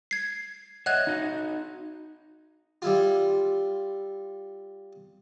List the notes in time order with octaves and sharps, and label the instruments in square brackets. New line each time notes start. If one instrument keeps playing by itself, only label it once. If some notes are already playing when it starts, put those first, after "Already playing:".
[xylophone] G#6 C7
[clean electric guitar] C#5 D#5 E5 [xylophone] F#5 F#6 G#6
[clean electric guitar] D#4 F#4 D#5
[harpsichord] G3 E4 F4